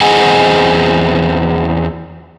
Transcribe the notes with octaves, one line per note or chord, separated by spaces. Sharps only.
E2 C4 G#4 D#5 F#5 G#5